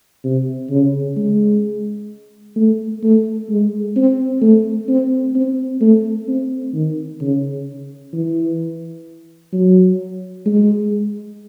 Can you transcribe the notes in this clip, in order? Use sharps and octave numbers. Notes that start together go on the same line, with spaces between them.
C3
C#3
G#3
A3
A3
G#3
C4
A3
C4
C4
A3
C4
D#3
C#3
E3
F#3
G#3